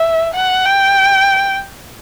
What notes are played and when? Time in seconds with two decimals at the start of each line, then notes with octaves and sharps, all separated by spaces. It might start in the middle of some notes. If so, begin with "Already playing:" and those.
Already playing: E5
0.34 F#5
0.65 G5